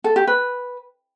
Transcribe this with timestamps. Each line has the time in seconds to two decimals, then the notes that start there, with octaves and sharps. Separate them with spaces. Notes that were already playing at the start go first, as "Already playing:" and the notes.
0.04 A4
0.16 G4
0.27 B4